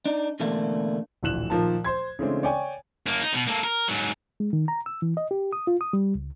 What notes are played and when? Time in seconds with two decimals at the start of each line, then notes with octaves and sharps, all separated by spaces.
0.06 D4 D#4
0.40 B2 D3 E3 A3 A#3 D4
1.23 D1 A#1 E3 F#6 E7 F#7
1.50 A#2 D#3 F3 A#4 A5
1.85 C5 C6 G#6
2.19 C#3 E3 G#3 A3 C4 D4
2.43 C#5 D5 G5 G#5 C#6
3.07 F#2 A#3
3.22 D#4
3.34 B2
3.48 A#3 A4
3.64 A#4
3.88 G#2 F#3
4.40 G#3
4.53 D#3
4.68 A#5
4.86 E6
5.02 E3
5.17 D#5
5.31 G4
5.53 D#6
5.67 F4
5.81 D#6
5.93 G3
6.15 C#2